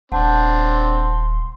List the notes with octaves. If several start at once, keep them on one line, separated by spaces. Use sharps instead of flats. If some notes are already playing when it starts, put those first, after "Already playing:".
D#1 C4 D4 F#5 A5 C6